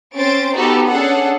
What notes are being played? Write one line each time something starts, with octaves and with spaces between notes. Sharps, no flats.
C4 C#4 C5 A6 D7
B3 D#4 F#4 G4 A4
C#4 D4 G#4 A4 F#5